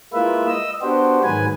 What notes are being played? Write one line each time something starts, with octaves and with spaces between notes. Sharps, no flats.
G#3 A#3 E4 F4 B4 E5
D#5 E6
B3 D4 F#4 G4 C5
G#2 D#3 F#3 G#3 B4 G#5